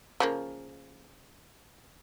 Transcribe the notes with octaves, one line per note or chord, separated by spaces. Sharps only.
C#3 F3 A#3